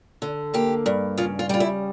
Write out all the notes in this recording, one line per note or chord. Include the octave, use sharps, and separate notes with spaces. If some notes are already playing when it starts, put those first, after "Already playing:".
D3
A#3 G4
G2
C#3 F4
F4
G3 F4
E4